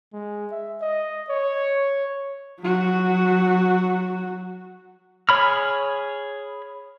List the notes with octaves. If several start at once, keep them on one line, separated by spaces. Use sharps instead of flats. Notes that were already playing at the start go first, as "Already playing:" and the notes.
G#3
E5
D#5
C#5
F#3 F#4
G#4 C#5 B5 F6